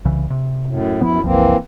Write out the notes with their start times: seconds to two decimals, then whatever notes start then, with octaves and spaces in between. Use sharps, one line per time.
0.05 C2 C#3 E3
0.30 C3
0.66 F#2 A2
1.01 F#2 F3 B3 E4
1.24 F#1 C2 E3 F3 A#3 C4